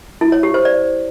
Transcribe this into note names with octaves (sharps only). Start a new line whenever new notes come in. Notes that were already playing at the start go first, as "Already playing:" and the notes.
E4
C#5
G4
C5
D5